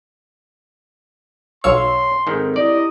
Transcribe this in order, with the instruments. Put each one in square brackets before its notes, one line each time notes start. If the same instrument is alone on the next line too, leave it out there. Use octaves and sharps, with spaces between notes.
[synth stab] B1 E6 [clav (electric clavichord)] C#5 F5 [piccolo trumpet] C6
[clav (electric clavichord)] G#2 D#3 [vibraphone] C4 A4
[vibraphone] E4 G4 A#5 [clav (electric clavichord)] D5 [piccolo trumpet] D#5